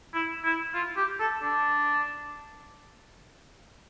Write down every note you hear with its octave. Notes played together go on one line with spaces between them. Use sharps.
E4
E4
F4
G4
A4
D4